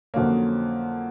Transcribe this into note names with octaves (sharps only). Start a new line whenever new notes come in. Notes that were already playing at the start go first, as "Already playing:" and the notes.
F2 D3 F#3 A#3 C#4